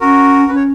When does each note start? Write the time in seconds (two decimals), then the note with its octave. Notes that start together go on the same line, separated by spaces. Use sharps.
0.01 C#4 F#4 A#4
0.48 C#4 B4
0.56 C#5